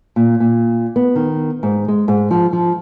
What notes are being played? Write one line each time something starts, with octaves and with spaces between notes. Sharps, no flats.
A#2
A#2
B3
D#3
G#2
G#3
G#2
F3
F3